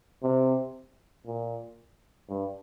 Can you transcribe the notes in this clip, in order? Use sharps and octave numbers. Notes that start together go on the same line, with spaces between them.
C3
A#2
G2